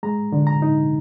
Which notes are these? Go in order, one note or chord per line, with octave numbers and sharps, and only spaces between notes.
G#3 A#5
D3
A#5
D#4